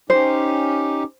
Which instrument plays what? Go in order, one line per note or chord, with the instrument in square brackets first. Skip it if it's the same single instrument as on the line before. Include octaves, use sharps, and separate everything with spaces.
[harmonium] C#4 D#4 G4 [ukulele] C5